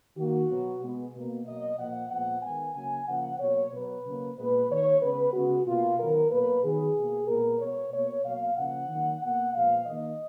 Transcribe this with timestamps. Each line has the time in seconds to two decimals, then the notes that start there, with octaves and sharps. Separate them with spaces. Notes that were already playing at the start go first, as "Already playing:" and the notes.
0.17 D#3 A#3 F#4
0.49 B2 F#3 B3
0.82 B2 G#3 B3
1.14 B2 A#3
1.46 B2 F#3 A#3 D#5
1.78 A#2 F3 A#3 F#5
2.10 A#2 F3 G#3 B3 F#5
2.42 D#3 G#3 B3 G#5
2.75 C#3 F#3 A#3 G#5
3.07 C#3 F3 A#3 F#5
3.40 B2 F#3 A#3 C#5
3.72 B2 F#3 B3 B4
4.04 C#3 F#3 A#3
4.36 A#2 G#3 B3 B4
4.69 D#3 A#3 C#5
5.01 C#3 G#3 B3 B4
5.33 C#3 G#3 B3 F#4
5.66 B2 A#3 F4
5.99 D#3 F#3 B3 A#4
6.30 B2 F#3 A#3 B4
6.63 D#3 F#3 B3 G#4
6.95 B2 A#3
7.27 A#2 G#3 B3 A#4
7.59 B2 G#3 B3 C#5
7.92 B2 A#3 C#5
8.24 B2 F#3 A#3 F5
8.57 C#3 F3 A#3 F#5
8.89 D#3 F#3 A#3
9.21 B2 A#3 F#5
9.54 A#2 F3 G#3 B3 F5
9.86 D#3 A#3 D#5